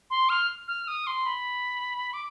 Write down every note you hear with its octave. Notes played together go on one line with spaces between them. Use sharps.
C6
F6
F6
D#6
C6
B5
D6